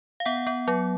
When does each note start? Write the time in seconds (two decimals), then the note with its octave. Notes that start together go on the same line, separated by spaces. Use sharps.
0.20 F5
0.25 B3 F#5
0.47 B3
0.68 F#3